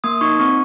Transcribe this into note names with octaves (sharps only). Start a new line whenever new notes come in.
A#3 D#6
D#4 C#6
C4 C#6